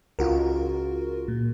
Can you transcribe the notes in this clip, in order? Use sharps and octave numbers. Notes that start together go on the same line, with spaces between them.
C#2 F4 F#4 A#4
A#2